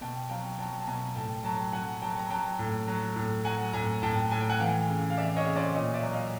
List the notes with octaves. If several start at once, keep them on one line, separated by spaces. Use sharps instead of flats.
B2 G5 A5
F#3 F5 G5
F#3 G5 A5
A5
B2 G#5 A#5
A2 G5 A5
F#3 G5 A5
F#3 F#5 G#5
F#3 G5 A5
A#5
F#3 G5 A5
A2
F#3
A2
F#3 F#5 G#5
A2 G#5 A#5
A2 G5 A5
A2 G#5
G5
F#5 G#5
E3 F5 G5
C#3
F5
E3 D5 E5
C#5 D#5
C#3
C5 D5
A#2 C#5 D#5
D5 E5
F#3
D#5 F5